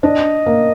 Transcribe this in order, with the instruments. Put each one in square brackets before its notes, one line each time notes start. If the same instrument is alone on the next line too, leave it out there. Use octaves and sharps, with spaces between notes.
[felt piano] D4 [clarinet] D#5
[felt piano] A#3